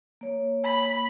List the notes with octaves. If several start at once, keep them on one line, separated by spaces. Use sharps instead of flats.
A#3 C#5
B5